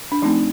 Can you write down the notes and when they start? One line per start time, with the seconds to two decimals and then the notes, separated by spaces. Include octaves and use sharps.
0.12 D4
0.22 F3 A3 C4 D#4